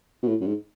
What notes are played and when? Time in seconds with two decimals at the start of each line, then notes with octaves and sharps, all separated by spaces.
0.23 B2
0.28 A2
0.41 F#2
0.47 G#2